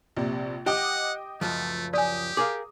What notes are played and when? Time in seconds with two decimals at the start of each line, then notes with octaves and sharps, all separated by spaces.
0.17 A#1 C3
0.66 G4 D#5 F#5 G5 D6
1.41 C#2 F#2 F3 A3
1.94 G4 D5 G#5 D#6
2.37 G#4 A#4 F5 D6